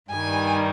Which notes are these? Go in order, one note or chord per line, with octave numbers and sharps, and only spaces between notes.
G2 D#3 G3 G#5